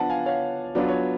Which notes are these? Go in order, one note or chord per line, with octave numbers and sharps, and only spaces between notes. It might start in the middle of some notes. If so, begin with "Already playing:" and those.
Already playing: F3 B3 D4 F#5 A5
F5 G#5
C#5 F5
F#3 B3 D4 F4 D5
C#5